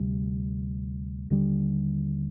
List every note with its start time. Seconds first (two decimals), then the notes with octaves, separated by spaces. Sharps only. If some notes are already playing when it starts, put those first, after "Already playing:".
Already playing: D2 C3 G3
1.30 D#2 D3 G3